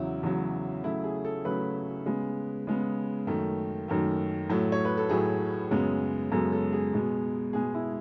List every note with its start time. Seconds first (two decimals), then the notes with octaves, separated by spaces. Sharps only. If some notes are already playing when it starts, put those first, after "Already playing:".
Already playing: E2 C#3 F#3 E4
0.23 E2 C#3 F#3
0.84 C#3 F#3 A3 E4
1.04 G#4
1.25 A4
1.45 C#3 F#3 A3 B4
2.06 C#3 G#3 B3
2.67 C#3 G#3 B3
3.27 F#2 D#3 A3
3.88 F#2 D#3 A3
4.49 A2 F#3 A3
4.72 C#5
4.85 B4
4.97 A4
5.09 A2 F#3 A3 G#4
5.71 F#2 C#3 G#3 B3
6.31 F#2 C#3 G#3 B3 A4
6.52 A4
6.73 G#4
6.93 B2 G#3 B3
7.53 B2 G#3 B3 G#4
7.74 E4